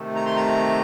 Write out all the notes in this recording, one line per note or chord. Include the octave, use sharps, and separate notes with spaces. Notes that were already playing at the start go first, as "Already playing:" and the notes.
Already playing: C3 D#3 A3
A#5
C6
A#5